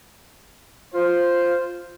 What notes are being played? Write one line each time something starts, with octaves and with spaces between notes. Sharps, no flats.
F4 C5